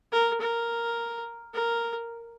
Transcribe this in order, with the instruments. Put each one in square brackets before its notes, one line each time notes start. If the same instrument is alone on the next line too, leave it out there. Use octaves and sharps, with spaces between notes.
[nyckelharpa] A#4
A#4
A#4